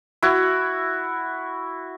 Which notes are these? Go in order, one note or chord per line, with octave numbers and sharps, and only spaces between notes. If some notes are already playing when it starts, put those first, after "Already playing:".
E4 F#4